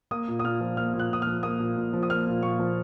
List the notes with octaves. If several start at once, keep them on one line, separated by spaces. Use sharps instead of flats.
A#3 D#6
A#2
D#6
A#2 F6
F3
A#3 F6
A#2
F#6
A#2 D#6
F3 F6
A#3 D#6
A#2
A#2
F3
D#6
A#3 F6
A#2
A#2 C#6
F3